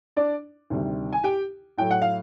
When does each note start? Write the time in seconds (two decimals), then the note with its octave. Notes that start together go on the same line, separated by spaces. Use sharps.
0.16 D4 D5
0.70 D2 C3 D#3 G3
1.13 G#5
1.24 G4 G5
1.78 A2 F#3 A3 G5
1.91 F#5
2.02 F5